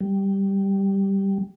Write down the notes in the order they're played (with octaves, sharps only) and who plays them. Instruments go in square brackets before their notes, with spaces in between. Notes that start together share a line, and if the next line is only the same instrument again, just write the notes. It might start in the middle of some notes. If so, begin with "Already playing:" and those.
[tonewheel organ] G3